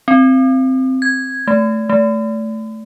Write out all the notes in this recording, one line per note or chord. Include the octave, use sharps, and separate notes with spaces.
C4
G#6
A3
A3